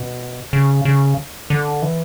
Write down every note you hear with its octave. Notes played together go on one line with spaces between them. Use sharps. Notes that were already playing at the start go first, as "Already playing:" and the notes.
Already playing: B2
C#3
C#3
D3
E3